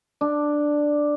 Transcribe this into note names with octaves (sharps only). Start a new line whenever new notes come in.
D4